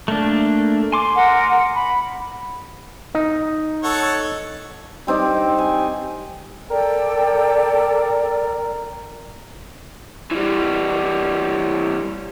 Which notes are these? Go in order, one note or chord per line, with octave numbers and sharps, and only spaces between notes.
A3 A#3 D4
G#5 C6 D6
A#4 F#5
B5
D#4
A4 C#5 F#5
G3 C4 D#4 D5
G#5
A4 A#4 D5 G5
E3 G3